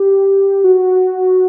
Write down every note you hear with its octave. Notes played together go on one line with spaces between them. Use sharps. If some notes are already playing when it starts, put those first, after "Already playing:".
Already playing: G4
F#4